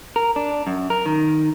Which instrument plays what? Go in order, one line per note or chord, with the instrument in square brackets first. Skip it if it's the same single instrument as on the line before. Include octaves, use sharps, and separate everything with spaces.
[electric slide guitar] A#4
D4
F#2
A#4
D#3